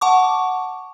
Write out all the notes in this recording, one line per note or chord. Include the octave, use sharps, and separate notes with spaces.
F#5 A5 C#6 D6